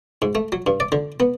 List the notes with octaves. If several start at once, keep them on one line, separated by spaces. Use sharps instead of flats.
G#2
A3
F#3
G2
D5
D3
B3